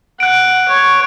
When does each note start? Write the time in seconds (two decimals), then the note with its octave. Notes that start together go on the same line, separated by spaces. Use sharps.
0.20 F#5 F#6 D7
0.68 C#5